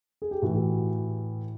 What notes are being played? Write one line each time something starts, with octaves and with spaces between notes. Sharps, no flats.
G#4
G4
A2 E3 F#4